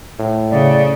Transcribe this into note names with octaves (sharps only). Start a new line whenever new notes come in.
A2
C#3 D5